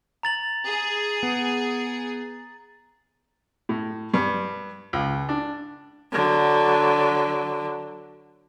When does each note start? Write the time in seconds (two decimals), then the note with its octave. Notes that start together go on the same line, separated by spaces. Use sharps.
0.23 A#5 A6 F#7
0.66 G#4
1.23 B3
3.69 A2
4.14 G2
4.93 C#2
5.29 D4
6.12 D3 F#3